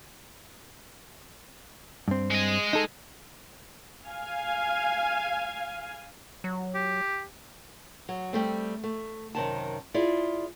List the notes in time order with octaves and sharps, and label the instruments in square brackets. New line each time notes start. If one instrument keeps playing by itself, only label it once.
[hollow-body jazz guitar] G2 C4
[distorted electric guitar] G#3 D#5
[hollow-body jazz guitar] D#4 A4
[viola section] F5 G#5
[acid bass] F#3
[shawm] G4
[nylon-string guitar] F#3
G3 A3 C4
A3
F#2 C3 D#3 A5
E4 F4 G#4 D5